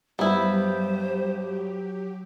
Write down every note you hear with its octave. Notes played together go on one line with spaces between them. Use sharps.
G2 F#3 B3 E4 G4 C5